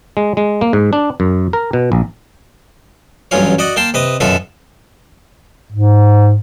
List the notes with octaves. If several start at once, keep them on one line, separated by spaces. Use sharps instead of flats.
G#3
G#3
A#3
G#2
D4
F#2
A#4
B2
A#1
A1 G2 F#3 C#4 F4 C#5
F#4 D5 D#5 F#5
A#3 G5 A5 C6
C3 B4 D#5 D#6
F#2 B2 F4 F#4 A4 E5
G#2